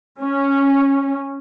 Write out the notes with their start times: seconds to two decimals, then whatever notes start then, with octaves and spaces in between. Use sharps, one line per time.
0.21 C#4